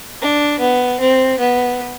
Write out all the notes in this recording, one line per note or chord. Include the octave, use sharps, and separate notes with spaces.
D4
B3
C4
B3